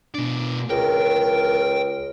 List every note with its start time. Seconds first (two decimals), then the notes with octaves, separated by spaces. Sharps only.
0.15 B2 D4 D5
0.70 C#2 A#4 G5